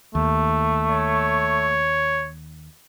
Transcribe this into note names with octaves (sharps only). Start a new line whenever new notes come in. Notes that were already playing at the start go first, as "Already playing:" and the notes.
D#2 A3
C#5